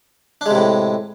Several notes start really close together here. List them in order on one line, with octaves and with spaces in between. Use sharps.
D4 G#3 C3 A2